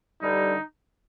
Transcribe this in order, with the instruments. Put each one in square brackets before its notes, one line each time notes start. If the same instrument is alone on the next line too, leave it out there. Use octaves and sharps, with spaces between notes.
[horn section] G2 D3 G3 D#4